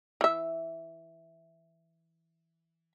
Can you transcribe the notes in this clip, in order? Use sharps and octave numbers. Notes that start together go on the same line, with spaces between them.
E3 E5